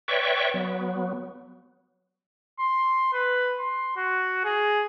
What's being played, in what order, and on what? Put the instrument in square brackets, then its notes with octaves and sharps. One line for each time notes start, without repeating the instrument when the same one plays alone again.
[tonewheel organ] B4 C#5 D5 E5 G5 C#6
F#3 B3
[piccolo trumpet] C6
B4
C6
F#4
G#4